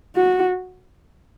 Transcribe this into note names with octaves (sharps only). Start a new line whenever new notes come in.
F#4